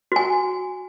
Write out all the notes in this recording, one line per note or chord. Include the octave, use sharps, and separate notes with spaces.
F#4 G#5